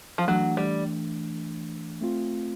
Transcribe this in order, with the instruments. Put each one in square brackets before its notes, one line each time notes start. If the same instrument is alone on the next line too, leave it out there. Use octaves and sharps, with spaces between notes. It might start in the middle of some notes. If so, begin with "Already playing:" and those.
[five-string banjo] F3
[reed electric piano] E3 A3 D4 [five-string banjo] F#3
[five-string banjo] G3
[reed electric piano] A3 C4 F4